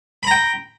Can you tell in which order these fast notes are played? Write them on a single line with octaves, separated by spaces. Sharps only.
B5 A#5 G5